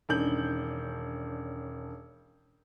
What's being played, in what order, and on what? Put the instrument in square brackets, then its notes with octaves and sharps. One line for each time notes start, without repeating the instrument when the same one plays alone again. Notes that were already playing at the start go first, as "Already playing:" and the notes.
[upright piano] E1 D#3 C#4 D4 G6 F#7